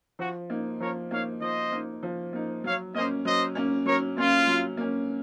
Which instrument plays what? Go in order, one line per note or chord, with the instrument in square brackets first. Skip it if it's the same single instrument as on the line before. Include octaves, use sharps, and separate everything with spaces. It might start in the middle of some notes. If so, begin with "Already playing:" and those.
[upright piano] F3 [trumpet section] F#4
[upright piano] A#3 D#4
[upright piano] F3 [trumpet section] A#4 C#5
[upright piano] A#3 D#4 [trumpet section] C#5 F5
[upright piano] F3 [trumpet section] C5 D#5
[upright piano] A#3 D#4
F3
A#3 D#4
[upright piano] F#3 [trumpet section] C#5 F5
[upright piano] A#3 C#4 [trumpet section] C5 D#5
[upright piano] F#3 [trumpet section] C5 D#5
[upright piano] A#3 C#4
[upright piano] F#3 [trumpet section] A#4 C#5
[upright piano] A#3 C#4 [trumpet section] F4
[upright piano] F#3
A#3 C#4